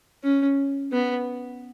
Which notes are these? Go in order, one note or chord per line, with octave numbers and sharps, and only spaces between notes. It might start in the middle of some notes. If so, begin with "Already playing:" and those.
C#4
B3